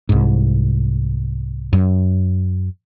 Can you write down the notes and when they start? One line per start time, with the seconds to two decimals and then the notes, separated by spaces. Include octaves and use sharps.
0.09 C2 G#2
1.73 F#2